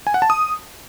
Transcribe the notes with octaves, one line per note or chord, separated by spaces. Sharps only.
G#5
F#5
A5
D#6